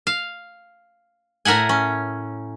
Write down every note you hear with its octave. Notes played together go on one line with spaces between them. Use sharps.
F5
A2 A#4 E5 F#5 G#5
C#4